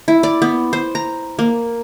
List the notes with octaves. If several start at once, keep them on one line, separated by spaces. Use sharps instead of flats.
E4
D5
B3
C5
A#5
A#3